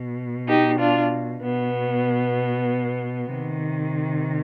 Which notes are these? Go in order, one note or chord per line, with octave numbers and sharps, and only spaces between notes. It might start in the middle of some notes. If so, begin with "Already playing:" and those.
Already playing: B2
D#4 G4
D4 F4
B2 B3
C3 D#3